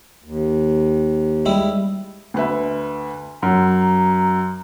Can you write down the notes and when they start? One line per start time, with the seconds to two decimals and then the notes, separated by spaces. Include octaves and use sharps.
0.24 D#2
1.46 G3 G#3 E4
2.34 D2 B4 E5
3.43 F#2 A#5